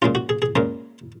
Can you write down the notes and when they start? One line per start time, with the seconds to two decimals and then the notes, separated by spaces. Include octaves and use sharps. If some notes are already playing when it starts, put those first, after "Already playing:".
0.02 A#2 G#3 C#4 F4
0.15 F#4
0.29 G#4
0.42 G#4
0.56 A#2 G#3 C#4 A#4